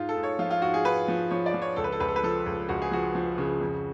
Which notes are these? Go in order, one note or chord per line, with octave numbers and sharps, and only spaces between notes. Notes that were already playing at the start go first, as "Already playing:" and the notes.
Already playing: G#2 F4
A4
G#2
C#5
F3 F4
F4
G#2 F#4
G#4
G#2 B4
F3
F3 C#5
D5
F3
C#5
C#2 A4
B4
A4
C#2 B4
A4
B4
F3 A4
C#2
C#2 F#4
G#4
F3 F#4
F3
C#3
F2